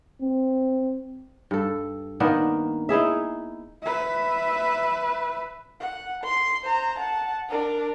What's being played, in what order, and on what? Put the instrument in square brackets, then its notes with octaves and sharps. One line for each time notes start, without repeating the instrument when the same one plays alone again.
[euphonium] C4
[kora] G2 A4
D#3 A#3 B3 D4
D#4 E4 G#4 E5
[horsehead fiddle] B4 E5
[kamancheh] F#5
C6
C5 A#5
F#5 A5
D4 A#4